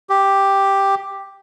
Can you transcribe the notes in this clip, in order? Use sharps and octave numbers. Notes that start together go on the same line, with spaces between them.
G4